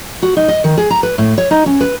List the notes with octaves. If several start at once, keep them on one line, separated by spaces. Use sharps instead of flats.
F#4
D#4
D#5
D#3
G#4
A#5
B4
A2
C#5
D#4
C#4
B4